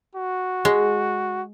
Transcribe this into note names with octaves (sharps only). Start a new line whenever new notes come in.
F#4
G#3